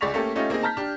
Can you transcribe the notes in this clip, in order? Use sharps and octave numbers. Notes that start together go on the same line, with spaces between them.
C#2 G#4 D5 C#6 B6 F7
A3 A#3 C#4 G4 A4
A3 C#4 D#4 F4 G4
A#3 C4 D#4 G#4
A5 A#5 F6 G6 B6
D4 G4